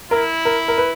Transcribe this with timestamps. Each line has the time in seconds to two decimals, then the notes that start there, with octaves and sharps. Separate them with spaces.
0.11 E4 A#4
0.45 A#4
0.68 A#4
0.78 B4